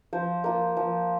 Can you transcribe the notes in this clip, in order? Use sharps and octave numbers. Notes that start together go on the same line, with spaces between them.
F3 C5
A#3 F4
F3